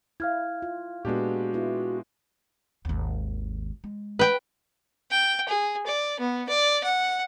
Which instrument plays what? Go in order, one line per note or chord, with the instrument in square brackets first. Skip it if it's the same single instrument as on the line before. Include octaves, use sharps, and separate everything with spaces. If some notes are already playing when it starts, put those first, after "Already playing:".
[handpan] E4 [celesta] F5 F6 G#6
[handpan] F4
[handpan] A#2 B3 [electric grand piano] G#3 D4 G4 [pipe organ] F#4
[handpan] B3 E4 F4
[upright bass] G#1 D#2
G#3
[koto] B4 G5
[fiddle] G5
G#4
D5
B3
D5
F#5